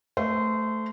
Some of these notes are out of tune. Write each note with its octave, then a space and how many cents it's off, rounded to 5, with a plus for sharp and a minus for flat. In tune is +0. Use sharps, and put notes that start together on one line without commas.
A3 +0 C5 -25